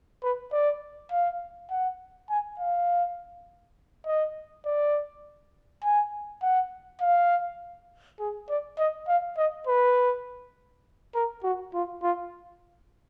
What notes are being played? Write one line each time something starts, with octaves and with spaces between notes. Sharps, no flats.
B4
D5
F5
F#5
G#5
F5
D#5
D5
G#5
F#5
F5
G#4
D5
D#5
F5
D#5
B4
A#4
F#4
F4
F4